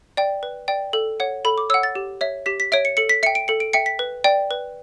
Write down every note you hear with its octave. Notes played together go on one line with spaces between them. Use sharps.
D5 G5
B4
D5 G5
A4
C#5 F#5
A4 B5
D6
C#5 F#5 E6
A6
G4
C#5 E5
G4 B6
B6
C#5 E5 D7
C#7
A4 C#7
B6
E5 G5 C#7
D7
A4 C#7
D7
E5 G5 C#7
B6
B4
D5 G5
B4